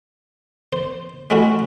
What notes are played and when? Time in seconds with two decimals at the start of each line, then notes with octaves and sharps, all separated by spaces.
0.73 C5
1.30 G#3 A3 C#4 E4 F#4